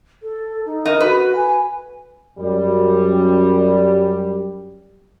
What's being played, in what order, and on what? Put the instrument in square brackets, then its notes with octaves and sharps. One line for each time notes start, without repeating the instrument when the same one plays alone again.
[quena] A4
D#4
[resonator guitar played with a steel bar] D#4 [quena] A#4
[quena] F#4 [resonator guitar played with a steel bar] B4
[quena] G#5
[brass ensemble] F#2 G3